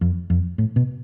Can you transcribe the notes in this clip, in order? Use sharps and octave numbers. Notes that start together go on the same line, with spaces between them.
F2
F2
A2
B2